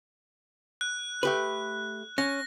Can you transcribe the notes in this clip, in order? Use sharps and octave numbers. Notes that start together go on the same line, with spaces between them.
F#6
A3 G4 B4
C#4 A#6